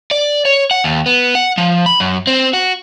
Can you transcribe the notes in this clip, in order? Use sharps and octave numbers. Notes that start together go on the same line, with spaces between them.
D5
C#5
F#5
D#2
B3
F#5
F3
B5
F#2
C4
F#4